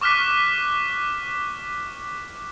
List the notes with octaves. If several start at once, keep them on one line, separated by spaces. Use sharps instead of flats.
C#6 D6 F6 F#6 B6